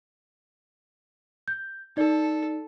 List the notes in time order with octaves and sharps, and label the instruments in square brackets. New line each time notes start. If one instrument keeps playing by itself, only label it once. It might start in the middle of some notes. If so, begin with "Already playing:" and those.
[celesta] G6
[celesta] D#4 D5 [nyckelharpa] A4